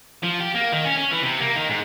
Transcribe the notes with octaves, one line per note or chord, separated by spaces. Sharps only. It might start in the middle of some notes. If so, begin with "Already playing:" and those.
F3
G4
A#3
D#3
C#4
C#4
E3
C3
A#3
D#3
G#2